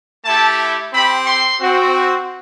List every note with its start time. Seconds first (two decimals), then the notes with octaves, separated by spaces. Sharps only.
0.25 A3 E4 G4 A5
0.93 C4 G4 B5
1.27 C6
1.61 C4 F#4